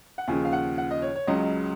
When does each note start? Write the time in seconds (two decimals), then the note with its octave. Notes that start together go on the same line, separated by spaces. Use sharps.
0.18 F#5
0.28 D#2 C#3 F3 G#5
0.45 F5
0.53 F#5
0.78 F#5
0.91 D#5
1.02 C#5
1.16 C#5
1.27 C#2 C#3 F#3 D#5